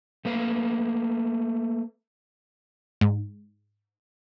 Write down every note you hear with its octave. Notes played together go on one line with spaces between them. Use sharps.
A3 A#3 B4 F5
G#2